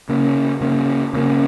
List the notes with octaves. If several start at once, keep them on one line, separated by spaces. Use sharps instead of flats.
C#3 A#3 C#4
C#3 A#3 C#4
C#3 A#3 C#4